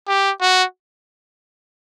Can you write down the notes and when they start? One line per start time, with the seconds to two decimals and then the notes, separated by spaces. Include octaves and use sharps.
0.08 G4
0.41 F#4